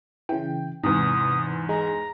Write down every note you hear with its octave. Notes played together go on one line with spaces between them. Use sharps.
C#3 E3 G5
E2 G#2 C3 D#6
G#3 A#5